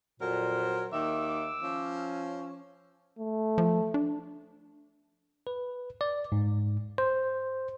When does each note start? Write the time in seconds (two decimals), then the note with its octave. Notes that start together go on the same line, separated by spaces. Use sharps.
0.20 F2 A#2 F#3 A#4 C5
0.93 D#2 D#3 E5 D6 E6
1.62 F3 C#4
3.19 A3
3.58 F3
3.94 D4
5.47 B4
6.01 D5
6.32 G#2
6.98 C5